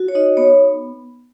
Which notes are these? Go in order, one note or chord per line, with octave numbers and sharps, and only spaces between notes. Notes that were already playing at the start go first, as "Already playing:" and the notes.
Already playing: F#4
C#5
D#4 D#5
B3 C#5